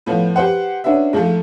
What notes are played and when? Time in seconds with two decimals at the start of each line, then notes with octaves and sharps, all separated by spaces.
0.06 A2 F3 B3
0.36 G4 B4 C5 F#5
0.84 C#4 D4 F#4 B4 E5
1.13 G#2 F3 G#3 A3